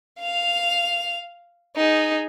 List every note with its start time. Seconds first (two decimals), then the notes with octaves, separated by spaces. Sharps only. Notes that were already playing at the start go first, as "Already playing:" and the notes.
0.21 F5 F7
1.76 D#4 G#4